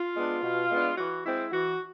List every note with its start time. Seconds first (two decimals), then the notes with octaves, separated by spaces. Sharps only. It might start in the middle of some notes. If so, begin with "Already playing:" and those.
Already playing: F4
0.15 G#3 B3 D4
0.42 B2
0.70 G#3 B3 D4
0.97 E3 F#4
1.24 G#3 C4 E4
1.52 E3 F#4